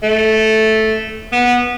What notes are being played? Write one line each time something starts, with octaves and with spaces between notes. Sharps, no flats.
A3
B3